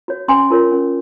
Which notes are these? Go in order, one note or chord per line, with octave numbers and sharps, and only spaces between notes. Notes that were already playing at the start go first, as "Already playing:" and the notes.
F#4 C#5
C#4 G#5 C6
F4 A#4 C#5
C#4